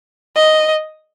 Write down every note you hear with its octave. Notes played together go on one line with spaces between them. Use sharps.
D#5